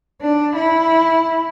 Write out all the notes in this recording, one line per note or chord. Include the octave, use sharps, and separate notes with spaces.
D4
E4